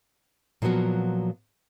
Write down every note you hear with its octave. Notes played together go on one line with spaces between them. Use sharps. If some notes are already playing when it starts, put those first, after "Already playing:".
A#2 F3 F#3 B3 F#4